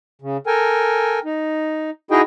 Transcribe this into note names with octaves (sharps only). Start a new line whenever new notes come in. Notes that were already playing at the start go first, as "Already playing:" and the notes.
C#3
A4 A#4 G5 G#5
D#4
D#4 E4 F#4 G#4 D#5 G5